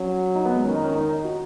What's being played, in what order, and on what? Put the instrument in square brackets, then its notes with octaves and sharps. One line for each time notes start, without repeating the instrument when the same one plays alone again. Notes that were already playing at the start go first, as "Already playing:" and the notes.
Already playing: [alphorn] F#3 [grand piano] C#4
[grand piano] D#4
B3
G#3
[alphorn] D#3 [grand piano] C#4
[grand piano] D#4
C#4
D#4
D#4
F#4